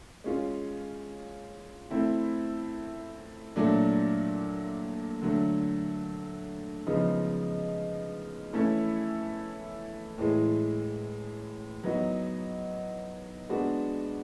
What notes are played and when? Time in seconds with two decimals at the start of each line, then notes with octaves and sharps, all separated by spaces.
0.24 G#3 C#4 F4
1.90 A3 C4 E4
3.56 A#2 F#3 A3 D4
5.21 D3 F#3 A3
6.87 C#3 F3 G#3 B3 D#4
8.53 E3 A3 C#4 E4
10.18 A2 E3 G#3
11.83 F#3 B3 D#4 F#4
13.49 G#3 B3 D4 F#4